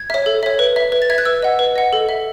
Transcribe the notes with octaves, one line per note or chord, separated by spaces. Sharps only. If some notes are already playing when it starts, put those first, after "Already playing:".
Already playing: G#6
C#5 E5
A4
C#5 E5
B4
E5
B4
A6
E5 G#6
F#6
B4 E6
D#5 F#5
B4
D#5 F#5
A4
E5